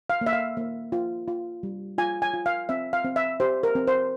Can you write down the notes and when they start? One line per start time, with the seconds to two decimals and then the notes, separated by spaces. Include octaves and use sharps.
0.10 F5
0.21 A#3
0.26 E5
0.33 F5
0.57 A#3
0.92 F4
1.28 F4
1.63 G3
1.98 F4 G#5
2.22 G#5
2.34 F4
2.46 F5
2.69 C4 E5
2.93 F5
3.04 C4
3.16 E5
3.40 G4 C5
3.63 A#4
3.75 C4
3.87 C5